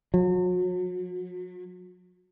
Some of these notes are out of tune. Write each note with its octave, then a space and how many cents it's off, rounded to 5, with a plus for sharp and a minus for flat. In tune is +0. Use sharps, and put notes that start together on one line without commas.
F#3 -35